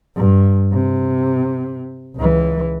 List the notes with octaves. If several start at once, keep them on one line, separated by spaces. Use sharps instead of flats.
G2
C3
C#2 E3